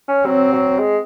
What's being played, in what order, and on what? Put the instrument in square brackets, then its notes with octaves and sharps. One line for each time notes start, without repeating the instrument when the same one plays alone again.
[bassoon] C#4
[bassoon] F#3 [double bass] C4
[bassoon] F#3
G#3